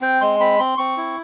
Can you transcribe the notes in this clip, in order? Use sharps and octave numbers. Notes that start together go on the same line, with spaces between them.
C4 G5
G#3 C6
C4 B5
C4 C6
C4 C#6
E4